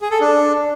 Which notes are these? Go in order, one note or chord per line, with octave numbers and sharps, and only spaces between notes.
G#4
A4
D4